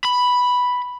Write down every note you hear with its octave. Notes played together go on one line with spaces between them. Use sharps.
B5